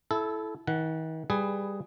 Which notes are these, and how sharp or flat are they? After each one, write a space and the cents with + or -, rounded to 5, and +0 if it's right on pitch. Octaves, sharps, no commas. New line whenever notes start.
E4 +0 A4 -20
D#3 +45 F#5 +0
G3 +15 G#4 +0 B4 +15